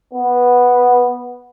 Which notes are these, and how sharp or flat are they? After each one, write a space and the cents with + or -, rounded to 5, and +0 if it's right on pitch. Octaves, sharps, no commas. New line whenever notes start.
B3 -5